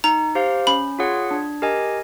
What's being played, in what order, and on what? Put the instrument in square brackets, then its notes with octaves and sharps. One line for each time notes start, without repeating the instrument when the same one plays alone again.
[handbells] D#4 [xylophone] A#5
[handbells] G4 C5 F5
[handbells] C#4 [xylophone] B5
[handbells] F4 G#4 C#5 F#5
D4
G4 A#4 D#5 G#5